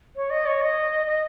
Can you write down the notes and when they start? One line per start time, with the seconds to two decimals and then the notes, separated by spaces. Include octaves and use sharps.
0.16 C#5
0.30 D#5
0.46 C#5
0.61 D#5
1.07 D#5